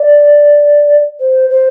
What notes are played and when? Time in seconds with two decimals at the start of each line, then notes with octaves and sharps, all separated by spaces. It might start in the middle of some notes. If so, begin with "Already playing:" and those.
Already playing: D5
1.20 C5
1.50 C5